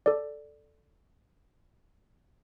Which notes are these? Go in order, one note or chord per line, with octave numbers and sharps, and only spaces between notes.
A4 D5